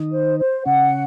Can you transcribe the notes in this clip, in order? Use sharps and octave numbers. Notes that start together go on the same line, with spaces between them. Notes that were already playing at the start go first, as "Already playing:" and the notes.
Already playing: D#3 D#4
C5
C5
C#3 C#4 F#5